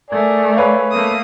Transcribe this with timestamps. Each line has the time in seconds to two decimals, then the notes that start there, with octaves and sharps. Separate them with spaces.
0.10 A3 G#4 A#4 D5
0.57 B4 C#5 F5
0.92 A3 A#3 A4 D#6